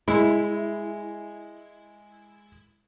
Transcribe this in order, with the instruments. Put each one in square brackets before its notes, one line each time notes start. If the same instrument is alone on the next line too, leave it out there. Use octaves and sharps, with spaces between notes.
[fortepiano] G#3 [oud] E4